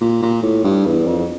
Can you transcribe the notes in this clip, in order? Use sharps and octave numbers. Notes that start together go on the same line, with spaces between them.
A#2
A#2
A2
G2
E2
F2